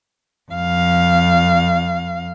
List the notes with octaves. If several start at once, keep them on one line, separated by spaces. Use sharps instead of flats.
F2 F5